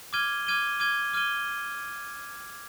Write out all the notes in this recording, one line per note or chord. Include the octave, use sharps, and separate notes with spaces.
D6 F6 G#6 D#7 G7
D6 F6 G#6 D#7 G7
D6 F6 G#6 D#7 G7
D6 F6 G#6 D#7 G7